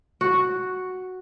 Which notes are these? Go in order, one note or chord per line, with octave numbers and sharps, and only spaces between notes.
F#4